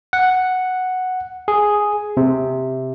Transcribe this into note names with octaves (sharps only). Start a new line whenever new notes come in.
F#5
G#4
C3